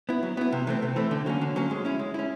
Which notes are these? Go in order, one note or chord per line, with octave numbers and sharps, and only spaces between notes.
B3 E4
F#3
B3 E4
C3
E3 A3 C4
C3
E3 A3 C4
D3
F#3 A#3 C#4
D3
F#3 A#3 C#4
G#3
C#4 E4
G#3
C#4 E4